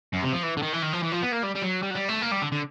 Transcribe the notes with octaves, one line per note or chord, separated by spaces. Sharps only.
F#2
C3
F3
E3
D3
D#3
E3
D#3
F3
E3
F3
B3
A#3
G3
G3
F#3
G3
F#3
G3
A3
A#3
G3
D3
D3